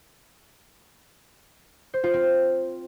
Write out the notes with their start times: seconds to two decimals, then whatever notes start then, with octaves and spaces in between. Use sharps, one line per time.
1.94 C5
2.04 F4
2.14 C4